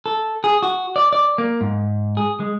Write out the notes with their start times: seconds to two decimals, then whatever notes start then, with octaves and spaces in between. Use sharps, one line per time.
0.06 A4
0.44 G#4
0.63 F#4
0.96 D5
1.13 D5
1.38 A#3
1.61 G#2
2.17 G#4
2.40 G#3